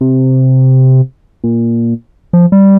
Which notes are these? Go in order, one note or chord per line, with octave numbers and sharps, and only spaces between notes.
C3
A#2
F3
G3